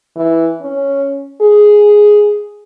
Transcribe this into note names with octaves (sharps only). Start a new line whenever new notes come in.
E3
C#4
G#4